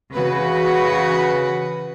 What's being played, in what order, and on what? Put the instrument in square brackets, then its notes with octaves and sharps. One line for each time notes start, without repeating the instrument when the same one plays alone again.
[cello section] C#3 E3 F#4 B4